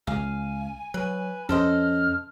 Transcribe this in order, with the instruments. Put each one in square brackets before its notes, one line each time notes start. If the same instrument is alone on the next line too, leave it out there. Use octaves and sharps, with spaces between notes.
[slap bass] C#2 [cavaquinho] F5 [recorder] G#5
[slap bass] F#3 [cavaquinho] B4
[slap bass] F2 [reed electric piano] C#4 [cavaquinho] A4 C5 D#5 [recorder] F6